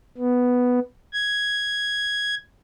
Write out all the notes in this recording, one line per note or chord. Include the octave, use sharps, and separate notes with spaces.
B3
G#6